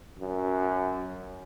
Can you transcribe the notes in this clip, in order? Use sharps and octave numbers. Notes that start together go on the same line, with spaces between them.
F#2